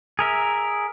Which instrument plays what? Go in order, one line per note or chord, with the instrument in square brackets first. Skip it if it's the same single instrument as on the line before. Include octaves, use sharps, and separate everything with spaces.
[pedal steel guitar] G#4 A#4 E5